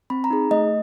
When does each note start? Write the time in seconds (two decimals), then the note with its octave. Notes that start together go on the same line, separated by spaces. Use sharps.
0.10 C4 B5
0.24 A#5
0.30 D#4 G#4
0.51 A3 D#5